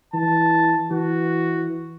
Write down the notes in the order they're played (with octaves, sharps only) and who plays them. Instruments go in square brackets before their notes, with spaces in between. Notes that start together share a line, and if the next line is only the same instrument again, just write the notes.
[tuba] E3 [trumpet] A5
[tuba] E3 [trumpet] F#4